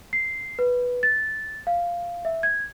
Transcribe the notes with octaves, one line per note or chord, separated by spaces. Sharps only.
C7
B4
A6
F5
E5
G#6